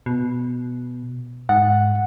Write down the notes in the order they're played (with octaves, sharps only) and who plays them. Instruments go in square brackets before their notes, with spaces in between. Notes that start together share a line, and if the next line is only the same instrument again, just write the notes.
[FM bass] B2
[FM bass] G#2 [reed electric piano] F#5